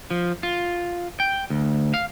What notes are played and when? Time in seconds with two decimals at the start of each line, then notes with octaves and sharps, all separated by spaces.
0.11 F3
0.43 F4
1.20 G5
1.50 D2
1.94 F5